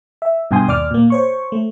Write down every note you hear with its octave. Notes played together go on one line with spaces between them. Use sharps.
E5
G2 B2 G5 G#5 C6 D#6
D#2 D5 D6 F6
A#2 A#3
C5 C#5 C#6
A3